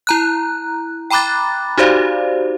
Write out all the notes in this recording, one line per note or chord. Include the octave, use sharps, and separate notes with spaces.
E4 A#5 F#6
G5 A#5 B5 D6 F#6 A6
D#4 F#4 G4 C5 D5 F5